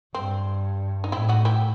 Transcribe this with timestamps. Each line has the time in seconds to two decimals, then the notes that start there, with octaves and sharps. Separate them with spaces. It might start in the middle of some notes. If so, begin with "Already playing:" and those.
0.14 G2 C4
1.04 D#4
1.12 A2 C4 E4
1.29 D#4 F#4
1.45 E4 G4